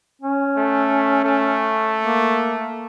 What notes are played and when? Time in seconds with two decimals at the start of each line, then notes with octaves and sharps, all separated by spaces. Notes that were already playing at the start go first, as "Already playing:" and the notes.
0.22 C#4
0.57 A3
1.24 A3
2.03 A#3